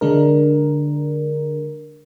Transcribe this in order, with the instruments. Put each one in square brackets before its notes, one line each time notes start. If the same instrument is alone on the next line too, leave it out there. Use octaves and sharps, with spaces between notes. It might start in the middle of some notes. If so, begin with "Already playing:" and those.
[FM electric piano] D3 G#3 D4 A#4